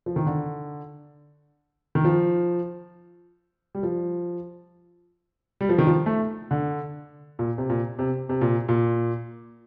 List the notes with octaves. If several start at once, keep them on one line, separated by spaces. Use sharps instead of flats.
F3
D#3
D3
D#3
F3
G3
F3
G3
F3
D#3
F3
A3
D3
A#2
C3
A#2
C3
C3
A#2
A#2